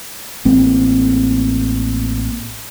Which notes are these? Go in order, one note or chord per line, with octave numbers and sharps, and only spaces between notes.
A1 A#3 C4